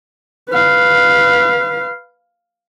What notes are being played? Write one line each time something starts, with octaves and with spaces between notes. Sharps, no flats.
B4 F5